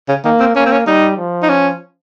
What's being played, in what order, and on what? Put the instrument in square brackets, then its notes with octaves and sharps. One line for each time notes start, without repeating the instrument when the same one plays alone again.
[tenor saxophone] C#3
[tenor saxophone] D#3 [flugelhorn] A#3
[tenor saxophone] C4
[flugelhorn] A#3 [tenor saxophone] C#4
[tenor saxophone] C4
C#4
[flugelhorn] G3 [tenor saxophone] D#4
[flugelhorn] F3
[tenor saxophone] D#4
C#4